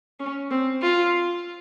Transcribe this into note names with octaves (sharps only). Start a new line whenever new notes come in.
C#4
C4
F4